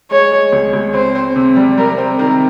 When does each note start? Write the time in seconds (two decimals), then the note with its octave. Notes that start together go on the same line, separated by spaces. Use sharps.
0.11 G#3 C#5
0.32 G#3
0.53 C#2
0.73 C#2
0.94 C4 C5
1.15 C4
1.36 C3
1.56 G3
1.77 G3 A#4
1.98 C4
2.19 D#3 A#4